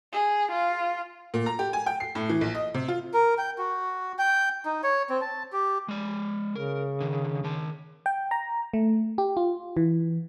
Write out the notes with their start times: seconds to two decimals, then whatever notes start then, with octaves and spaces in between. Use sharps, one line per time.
0.13 G#4
0.52 F4
1.34 A#2
1.46 A#5
1.59 G4
1.73 G#5
1.86 G5
2.00 C7
2.15 A2
2.29 E3
2.41 A#1
2.55 D#5
2.74 C3
2.88 F4
3.14 A#4
3.38 G5
3.58 F#4
4.19 G5
4.65 D#4
4.83 C#5
5.10 C4
5.21 A5
5.53 G4
5.88 G#3 D5
6.55 C#3 A#4
7.01 D3 D#3
7.44 D#3 A5
8.06 G5
8.31 A#5
8.74 A3
9.18 G4
9.37 F4
9.77 E3